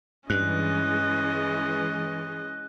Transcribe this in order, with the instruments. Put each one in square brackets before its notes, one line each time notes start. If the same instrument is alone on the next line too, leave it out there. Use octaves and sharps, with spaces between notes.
[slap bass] G2 [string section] E3 G#3 [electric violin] C#4 D#5 [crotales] F#6